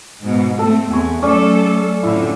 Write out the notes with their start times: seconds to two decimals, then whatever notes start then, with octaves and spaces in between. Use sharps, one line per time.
0.23 G#2 B2
0.59 A3 C4 A4
0.91 E2 G#5 C#6
1.22 F#3 A3 C#4 A4 D5
2.03 F2 A2 D3 E4